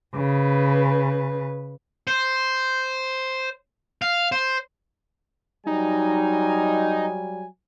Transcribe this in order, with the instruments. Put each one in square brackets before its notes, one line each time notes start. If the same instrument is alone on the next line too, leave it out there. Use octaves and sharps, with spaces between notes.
[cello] C#3 B4
[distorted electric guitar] C5
F5
C5
[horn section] F#3 G3 G#5 [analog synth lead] D#4